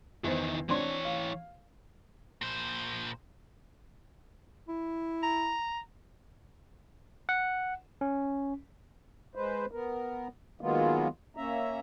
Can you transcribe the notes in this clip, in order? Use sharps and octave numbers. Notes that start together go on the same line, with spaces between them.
E2 D#3 E3 C5
E3 C4 D4 C#5 C6
F5
A#2 C5
E4
A#5
F#5
C#4
G#3 B4 C5
B3 A#4
D#3 F#3 G#3 A#3 B3 F4
A#3 C#4 E5 A#5